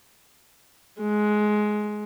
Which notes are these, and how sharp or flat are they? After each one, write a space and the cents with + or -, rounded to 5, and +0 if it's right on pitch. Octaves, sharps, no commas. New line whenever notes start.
G#3 +15